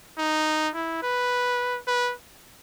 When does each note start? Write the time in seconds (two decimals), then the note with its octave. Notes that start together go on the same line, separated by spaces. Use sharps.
0.18 D#4
0.75 E4
1.03 B4
1.87 B4